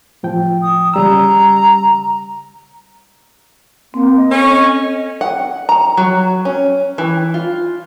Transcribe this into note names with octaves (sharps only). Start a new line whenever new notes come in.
A2 F3 G5
D#6
C#3 G3 A#5 E6
A#3 C4
D#5
C#4 A4
F#5
A#5
F#3
C#4
E3
F4